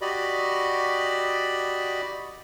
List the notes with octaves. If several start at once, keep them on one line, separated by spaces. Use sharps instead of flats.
F#4 G4 D5 D#5 B5